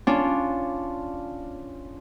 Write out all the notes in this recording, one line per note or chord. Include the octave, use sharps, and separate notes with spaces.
C#4 D4 F4